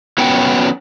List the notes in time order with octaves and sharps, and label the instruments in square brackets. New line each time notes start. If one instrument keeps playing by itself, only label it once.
[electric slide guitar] F#3 B3 C#4 F#4 F#5 G5